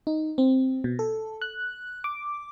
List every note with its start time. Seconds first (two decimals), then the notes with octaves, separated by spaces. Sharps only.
0.07 D#4
0.38 C4
0.84 B2
0.99 A4
1.41 F#6
2.04 D6